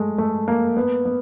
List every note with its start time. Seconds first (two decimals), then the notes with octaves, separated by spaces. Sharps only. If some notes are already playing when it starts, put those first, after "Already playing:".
Already playing: G#3 A3
0.18 A3
0.48 A#3
0.77 B3
1.05 B3